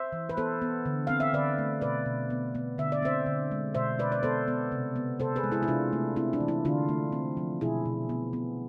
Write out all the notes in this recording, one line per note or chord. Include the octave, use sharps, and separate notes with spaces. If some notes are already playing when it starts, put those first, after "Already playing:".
Already playing: C5 E5
E3
B4
B3 A4 C5
B3
D3
C4 F5
E5
D3 B4 D5
A3
B2 B4 D5
B2
B3
B3
D3 E5
D5
C4 C5 E5
D3
G#3
B2 C5 E5
B2 B4 D5
D5
B3 A4 C5
B3
C3
B3
C3 A4 C5
G#4 B4
G#3
E4 G#4
E4
C3 D4 F4
A3
C4 E4
D4
E3
E4
D3 D4 F4
A3
C4
F3
B2 E4 G#4
B2
B3
B3